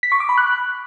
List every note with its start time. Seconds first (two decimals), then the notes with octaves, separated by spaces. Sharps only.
0.03 B6
0.12 C#6
0.20 D6
0.29 B5
0.38 F#6